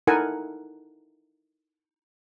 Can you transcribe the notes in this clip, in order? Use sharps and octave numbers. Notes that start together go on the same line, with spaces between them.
D#4 E4 A4 A#4 F#5 G#5